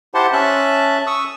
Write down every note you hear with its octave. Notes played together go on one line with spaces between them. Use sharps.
E4 G4 C5 F#5 A5 C6
C#4 E5 A5 F#6
C#6 D#6 E6